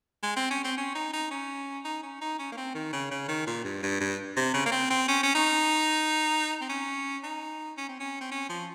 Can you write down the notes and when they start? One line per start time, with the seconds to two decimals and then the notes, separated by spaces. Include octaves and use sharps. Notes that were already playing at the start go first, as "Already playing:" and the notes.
0.23 G#3
0.36 C4
0.50 C#4
0.64 C4
0.77 C#4
0.95 D#4
1.13 D#4
1.31 C#4
1.84 D#4
2.03 C#4
2.21 D#4
2.39 C#4
2.52 A#3
2.57 C4
2.74 D#3
2.93 C#3
3.11 C#3
3.28 D#3
3.47 A#2
3.64 G2
3.83 G2
4.00 G2
4.36 C3
4.54 C#3
4.66 A#3
4.72 C4
4.90 C4
5.08 C#4
5.23 C#4
5.35 D#4
6.61 C4
6.69 C#4
7.23 D#4
7.77 C#4
7.89 C4
8.00 C#4
8.21 C4
8.31 C#4
8.49 F3